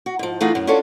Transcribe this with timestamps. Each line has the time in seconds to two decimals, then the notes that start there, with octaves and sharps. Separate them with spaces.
0.06 F#4
0.19 G#2 F3
0.41 E3 A3 D#4 F4 G#4 F#5
0.55 F#2
0.67 C#4 D4 F4 F#4 A4 C#5